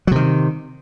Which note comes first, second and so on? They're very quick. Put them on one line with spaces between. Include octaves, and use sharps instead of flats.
F#3 C3 D#3